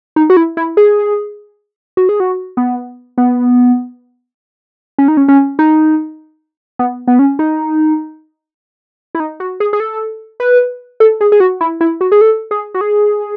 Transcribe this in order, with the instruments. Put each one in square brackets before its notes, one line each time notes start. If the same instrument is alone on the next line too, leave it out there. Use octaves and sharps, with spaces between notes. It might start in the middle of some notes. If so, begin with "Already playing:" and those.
[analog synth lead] D#4
F#4
E4
E4
G#4
F#4
G#4
F#4
B3
B3
C#4
D#4
C#4
C#4
D#4
B3
B3
C#4
D#4
E4
D#4
F#4
G#4
G#4
A4
B4
A4
G#4
G#4
F#4
E4
E4
F#4
G#4
A4
G#4
F#4
G#4